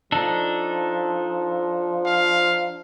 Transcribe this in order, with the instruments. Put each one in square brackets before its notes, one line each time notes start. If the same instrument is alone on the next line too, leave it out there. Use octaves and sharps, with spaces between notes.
[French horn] F3 [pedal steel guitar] D4 D#4 A4
[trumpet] F5